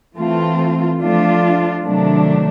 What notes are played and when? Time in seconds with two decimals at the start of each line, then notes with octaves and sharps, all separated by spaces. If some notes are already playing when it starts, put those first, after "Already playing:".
0.18 E3 A3 C4 F4
1.02 F3 A3 D4 F4
1.85 C3 D#3 F#3 A3 D4